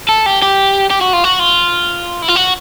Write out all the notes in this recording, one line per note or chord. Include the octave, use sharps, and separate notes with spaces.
A4
G4
G4
G4
F#4
F4
F#4
F4
E4
F4
F#4